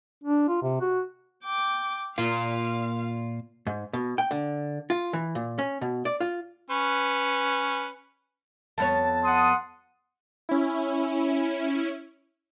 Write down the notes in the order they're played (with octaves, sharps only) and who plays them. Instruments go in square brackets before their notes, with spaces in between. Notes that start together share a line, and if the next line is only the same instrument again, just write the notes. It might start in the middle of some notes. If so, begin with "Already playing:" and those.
[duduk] D4
F4
C3
F#4
[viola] G5 D6
[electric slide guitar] A#2 A#3 F4 [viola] F5
[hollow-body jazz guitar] G#2
B2
G5
D3
F4
E3
A#2
C#4
B2
D5
F4
[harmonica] C#4 B4
[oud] F2 B3 C#5 [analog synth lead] A5
[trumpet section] F#5 C6 D#6
[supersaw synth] C#4 E4